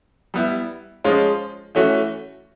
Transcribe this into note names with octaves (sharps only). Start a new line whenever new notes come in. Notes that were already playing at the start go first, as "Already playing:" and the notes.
G3 B3 E4
F3 G#3 C#4 F4
E3 A3 C#4 F#4